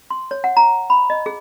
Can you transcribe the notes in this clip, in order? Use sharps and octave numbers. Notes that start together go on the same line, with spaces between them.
C6
C#5
F#5
A#5
B5
D#5
G#4